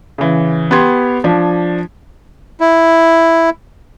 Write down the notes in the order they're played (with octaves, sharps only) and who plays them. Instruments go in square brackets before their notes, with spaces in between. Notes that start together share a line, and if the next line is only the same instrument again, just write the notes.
[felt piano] C#3 E3
B3 G4 C6 G#6
F3 D4
[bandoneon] E4